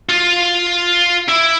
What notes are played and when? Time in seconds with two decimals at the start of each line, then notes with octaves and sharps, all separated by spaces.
0.09 F4
1.29 E4